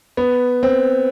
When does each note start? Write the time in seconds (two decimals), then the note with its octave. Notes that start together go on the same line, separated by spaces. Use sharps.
0.17 B3
0.63 C4